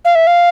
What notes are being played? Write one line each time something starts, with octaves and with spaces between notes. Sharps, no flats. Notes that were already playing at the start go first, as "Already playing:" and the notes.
F5
E5
F5